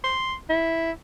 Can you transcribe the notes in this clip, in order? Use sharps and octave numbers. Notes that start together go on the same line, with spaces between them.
C6
E4